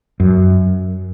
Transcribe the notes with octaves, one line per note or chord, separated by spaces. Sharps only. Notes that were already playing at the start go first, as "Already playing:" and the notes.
F#2